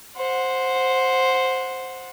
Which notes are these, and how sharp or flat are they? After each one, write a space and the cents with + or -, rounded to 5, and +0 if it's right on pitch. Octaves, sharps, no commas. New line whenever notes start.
C5 +0 F#5 -15